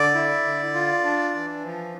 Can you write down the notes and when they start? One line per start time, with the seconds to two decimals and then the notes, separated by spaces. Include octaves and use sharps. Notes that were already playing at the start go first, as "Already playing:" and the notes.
Already playing: D3 D5
0.15 E4
0.45 D3
0.74 F4
1.04 D4
1.34 E3
1.64 F3